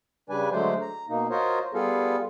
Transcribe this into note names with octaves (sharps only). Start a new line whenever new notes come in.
C#3 G3 D4 B4 D5 G#5
D3 F#3 G#3 A3 C5 D5
A#5
B2 A#3 D#4
F4 F#4 A#4 C5 C#5 D#5
G3 B3 F4 G#4 A4 F5